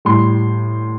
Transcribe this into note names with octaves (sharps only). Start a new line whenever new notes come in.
A2 G3 C6